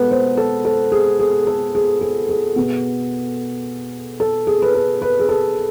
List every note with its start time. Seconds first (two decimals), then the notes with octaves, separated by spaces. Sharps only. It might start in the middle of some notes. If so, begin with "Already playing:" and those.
Already playing: B2 G#3 B3 A4 B4
0.11 C5
0.37 A4
0.65 A4
0.92 G#4
1.19 G#4
1.47 A4
1.75 G#4
2.01 G#4
2.29 G#4
2.56 B2 B3
4.20 A4
4.47 G#4
4.62 B4
4.75 A4
5.02 B4
5.19 G#4
5.29 A4